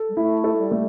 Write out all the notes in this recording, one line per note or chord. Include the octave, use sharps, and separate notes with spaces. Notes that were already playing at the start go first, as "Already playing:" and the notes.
Already playing: A4
G3
A3 E4
A4
G3
A3